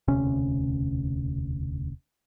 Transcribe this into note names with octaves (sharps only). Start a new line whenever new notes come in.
E1 D2 C3 C#4